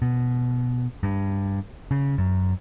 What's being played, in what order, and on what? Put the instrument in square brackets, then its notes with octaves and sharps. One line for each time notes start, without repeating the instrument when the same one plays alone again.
[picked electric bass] B2
G2
C#3
F#2